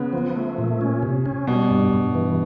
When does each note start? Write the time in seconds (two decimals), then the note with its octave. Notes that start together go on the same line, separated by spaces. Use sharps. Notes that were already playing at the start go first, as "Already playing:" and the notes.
Already playing: C#3 B3
0.13 F3
0.35 A3
0.58 A#2
0.81 C#4
1.03 C3
1.26 C#4
1.47 B2 G3
1.71 G2
1.93 G2
2.15 E3